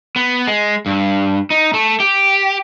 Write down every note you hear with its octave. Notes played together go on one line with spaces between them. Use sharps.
B3
G#3
G2
D#4
A3
G4